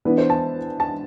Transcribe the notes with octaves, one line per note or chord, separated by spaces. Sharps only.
E3 B3 D4 B4
C5
A5
A5